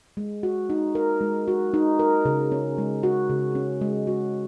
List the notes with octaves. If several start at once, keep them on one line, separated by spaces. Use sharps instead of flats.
G#3
F#4
D#4
A#4
G#3
F#4
D#4
A#4
C#3
C#4
G#3
F#4
C#3
C#4
G#3
F#4